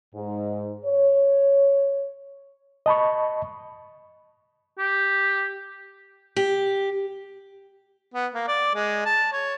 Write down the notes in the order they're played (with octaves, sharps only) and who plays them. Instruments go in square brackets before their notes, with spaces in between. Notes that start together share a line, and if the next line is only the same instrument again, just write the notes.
[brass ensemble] G#2
C#5
[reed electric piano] D#5 A5 B5 C#6
[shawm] G4
[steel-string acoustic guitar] G4
[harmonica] B3
A#3
D5
G#3
A5
C#5